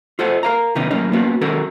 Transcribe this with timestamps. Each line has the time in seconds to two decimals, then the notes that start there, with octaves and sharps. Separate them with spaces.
0.19 F4 A4 C5 F#5
0.43 A#4 F5 A#5
0.75 C3 D#3 B3 C#4 D#4
0.91 F#2 A2 A#3 C#4 D#4
1.13 A#3 B3 C#4 F#4
1.41 D#3 G#3 C#4 F#4 A4 A#4